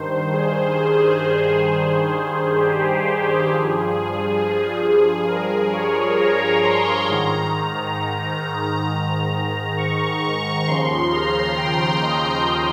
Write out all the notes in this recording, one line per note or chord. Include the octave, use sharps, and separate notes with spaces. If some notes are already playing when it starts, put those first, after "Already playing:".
Already playing: G2 D#3 C5
G#4
G4
G2 F3 G#4
G#4
G#4
G#4
A#4
C#5
A#5
C6
G#2 D#3 A#5
A#5
C#6
C#6
D#2 C#3 F3 C6
A#5
G5
D#5